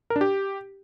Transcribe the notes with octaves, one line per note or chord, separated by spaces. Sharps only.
A#4
D4
G4